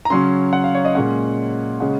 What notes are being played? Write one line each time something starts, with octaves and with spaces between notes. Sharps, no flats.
A#5
C#3 F#3 C#4 C6
F#5
F5
C#5
D#5
A#2 G#3 C#4 F#5
C#3 G#3 C#4 F#5